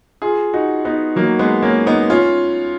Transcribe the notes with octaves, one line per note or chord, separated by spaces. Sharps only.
F4 G#4
D#4 F#4
B3 D#4
F#3 A#3
G#3 B3
A#3 C#4
B3 D#4
C#4 F4